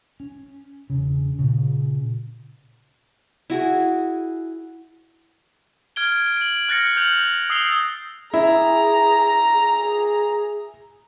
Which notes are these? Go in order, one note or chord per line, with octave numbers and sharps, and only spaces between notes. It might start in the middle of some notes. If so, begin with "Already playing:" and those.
C#4
E1 C#3
A#2 C#3
E4 F#4 G#4
F6 G#6 D7 G7
D7 F#7
F6 F#6 A6 A#6 C#7
F6 G6 F7 F#7
D#6 E6 C7 F7 G7
E4 G#4 A#5
G#4